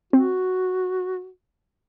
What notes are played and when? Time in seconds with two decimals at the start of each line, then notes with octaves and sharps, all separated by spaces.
0.13 C4 F#4